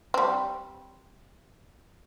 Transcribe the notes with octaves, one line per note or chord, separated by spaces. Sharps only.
G3 C4